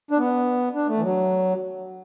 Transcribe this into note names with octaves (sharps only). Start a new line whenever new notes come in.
D4
B3
D4
A3
E3
F#3